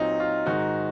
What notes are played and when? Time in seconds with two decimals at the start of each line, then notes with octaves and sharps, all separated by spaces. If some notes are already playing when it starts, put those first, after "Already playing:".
Already playing: A#2 F#3 C4 D#4
0.20 F4
0.46 G#2 D#3 G#3 D#4 F#4